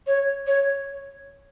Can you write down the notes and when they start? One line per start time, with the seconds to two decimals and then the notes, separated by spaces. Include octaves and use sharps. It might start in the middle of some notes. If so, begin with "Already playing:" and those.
0.07 C#5
0.47 C#5